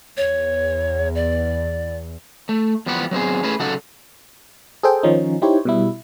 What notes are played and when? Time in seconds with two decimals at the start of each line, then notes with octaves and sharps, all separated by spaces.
0.17 E2 C#5
1.15 D5
2.49 A3
2.86 E2 F3 G3 B3 G4 F#5
3.11 F#3 B3 C4 G#4
3.43 A3 C#4 E4 G#4 B4
3.60 C#3 F#3 D#4 A4 F#5
4.83 G#4 A4 C5 G5
5.03 D#3 F3 C#4 D#4
5.42 D#4 E4 G4 C5 C#5
5.65 B2 G3 E4